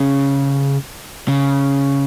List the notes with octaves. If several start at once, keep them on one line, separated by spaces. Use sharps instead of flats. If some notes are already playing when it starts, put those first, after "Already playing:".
Already playing: C#3
C#3